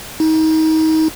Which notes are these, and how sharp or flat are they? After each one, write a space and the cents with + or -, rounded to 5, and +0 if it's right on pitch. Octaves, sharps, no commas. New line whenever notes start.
D#4 +30